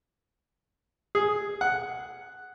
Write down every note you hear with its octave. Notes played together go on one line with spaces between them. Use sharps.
G#4
F#5